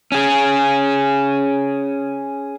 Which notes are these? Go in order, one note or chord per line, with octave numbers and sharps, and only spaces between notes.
C#4 G#4